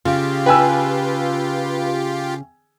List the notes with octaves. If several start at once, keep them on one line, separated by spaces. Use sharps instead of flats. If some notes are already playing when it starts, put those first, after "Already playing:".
C#3 F4 G4
B4 G5 G#5 E6